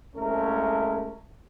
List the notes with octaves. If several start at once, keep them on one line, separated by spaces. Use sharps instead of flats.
C2 G#3 A3 C#4 A#4